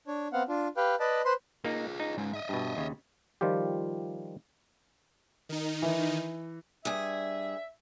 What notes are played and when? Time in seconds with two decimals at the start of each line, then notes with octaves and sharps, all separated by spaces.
0.07 D4 C#5
0.33 B3 C4 F5 F#5
0.49 D4 F4
0.77 G4 B4 F5 G5
1.00 B4 D5 D#5 A5 B5
1.25 B4 C5 B5 C6
1.64 A#3 D#4 F4 G#4
2.00 D#4
2.18 G#2 G#3 C#4
2.33 D#5 E5
2.49 G2 B2
2.77 D#2 C#3
3.41 D#3 F3 G3 F4 G4
5.49 D#3 D#4
5.82 E3
6.85 G2 G#4 E5